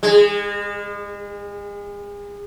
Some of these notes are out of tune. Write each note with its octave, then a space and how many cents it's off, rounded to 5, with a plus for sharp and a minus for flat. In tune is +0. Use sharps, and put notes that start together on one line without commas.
G#3 -35